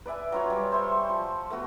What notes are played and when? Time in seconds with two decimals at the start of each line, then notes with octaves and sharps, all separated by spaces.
0.06 B4 D5 E5 G#5
0.32 F#3 F4 C#5
0.50 G3
0.72 C5 E5 C6 C#6
1.09 F3
1.50 A3 B3 F#4